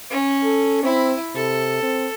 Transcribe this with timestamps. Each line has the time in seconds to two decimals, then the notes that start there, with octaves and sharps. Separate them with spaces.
0.11 C#4
0.44 A4
0.84 C4 E4 B5
1.35 C3 A4
1.82 C4